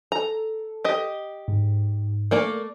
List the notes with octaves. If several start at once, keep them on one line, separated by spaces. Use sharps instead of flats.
A4 A#5
G4 D#5
G#2
A3 A#3 D5